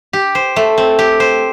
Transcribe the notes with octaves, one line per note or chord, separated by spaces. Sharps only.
G4
C5
A3
C4
G4
C5